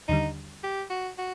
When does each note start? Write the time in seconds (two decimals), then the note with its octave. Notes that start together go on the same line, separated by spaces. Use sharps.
0.08 D#2 D3 G3 D#4
0.64 G4
0.90 F#4
1.18 F#4